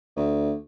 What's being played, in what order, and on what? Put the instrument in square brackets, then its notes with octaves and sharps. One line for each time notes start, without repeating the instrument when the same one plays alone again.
[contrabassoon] D2